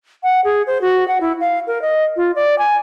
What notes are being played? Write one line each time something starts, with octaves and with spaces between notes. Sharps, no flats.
F#5
G#4
C5
F#4
F#5
E4
F5
A#4
D#5
F4
D5
G#5